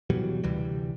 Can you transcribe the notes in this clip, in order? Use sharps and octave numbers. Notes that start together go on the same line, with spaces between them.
B2 E3 F#3 G3
D2 C3 E3 G3